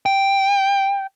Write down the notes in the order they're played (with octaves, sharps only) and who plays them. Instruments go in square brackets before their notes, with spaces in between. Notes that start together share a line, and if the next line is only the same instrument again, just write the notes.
[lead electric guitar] G5